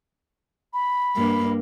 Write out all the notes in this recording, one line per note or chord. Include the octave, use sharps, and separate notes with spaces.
B5
G2 A#3